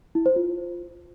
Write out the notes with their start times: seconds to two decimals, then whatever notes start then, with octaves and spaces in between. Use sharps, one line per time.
0.15 E4
0.26 C5
0.36 F4